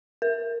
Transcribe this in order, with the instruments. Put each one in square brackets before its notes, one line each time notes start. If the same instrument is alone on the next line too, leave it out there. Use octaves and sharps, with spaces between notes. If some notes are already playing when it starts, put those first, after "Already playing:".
[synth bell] A#4